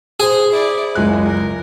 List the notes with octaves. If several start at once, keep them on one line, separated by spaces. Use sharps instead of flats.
G#4 C5
E4 D5
F#1 C#2 G#3 F#6
A#4